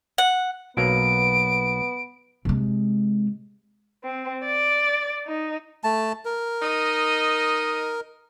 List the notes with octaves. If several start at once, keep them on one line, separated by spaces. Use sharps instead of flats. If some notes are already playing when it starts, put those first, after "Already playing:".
F#5
B1 F#3 A#3 B3 D7
C3 G#3
C4
D5
D#4
A3 A5
A#4
D#4 D#5